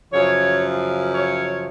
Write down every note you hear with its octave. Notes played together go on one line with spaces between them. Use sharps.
F#2 C#3 F3 C#5
C#5